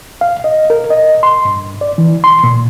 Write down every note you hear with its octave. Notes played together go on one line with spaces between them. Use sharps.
F5
D#5
A#4
D#5
C6
G2
D5
E3
C6
A#2